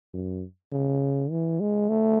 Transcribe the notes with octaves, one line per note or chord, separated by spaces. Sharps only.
F#2
C#3
E3
G#3
A3